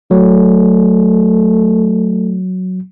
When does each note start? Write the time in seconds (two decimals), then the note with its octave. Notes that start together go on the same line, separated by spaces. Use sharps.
0.11 F#3 A3